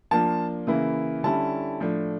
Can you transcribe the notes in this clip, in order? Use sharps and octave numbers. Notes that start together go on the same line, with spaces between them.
F3 A#3 D4 F4 A5
C#3 E3 A#3 E4
D3 G3 C#4 E4 A5
A2 F3 A3 D4